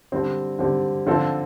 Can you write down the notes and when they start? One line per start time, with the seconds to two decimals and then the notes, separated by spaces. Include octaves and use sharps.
0.12 D3 G3 C4
0.59 D3 G3 C4
1.07 D3 F3 C4 F4 A4